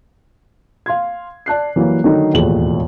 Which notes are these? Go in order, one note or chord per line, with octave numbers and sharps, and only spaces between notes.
F5 C6 G#6
D5 A5 F#6 C7
E3 F#3 G3 A#3
D3 D#3 F#3 A3 D#4 A4
E1 D#2 A2 F3 G#4 F#7